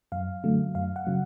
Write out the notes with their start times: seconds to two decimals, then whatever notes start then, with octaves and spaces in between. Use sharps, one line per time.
0.12 F#2 F5
0.44 D3 F#3 A3
0.75 F#2 F5
0.96 F#5
1.07 C#3 F#3